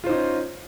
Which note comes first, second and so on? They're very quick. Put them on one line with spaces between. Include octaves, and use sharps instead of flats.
F4 C5 D#4 C#4